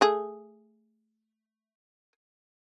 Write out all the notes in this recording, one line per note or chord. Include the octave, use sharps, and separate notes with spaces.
A3 G#4